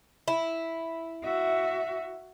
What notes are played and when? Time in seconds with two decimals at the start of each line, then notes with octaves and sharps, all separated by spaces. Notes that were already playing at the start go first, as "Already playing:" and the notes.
0.28 E4
1.24 F#4 E5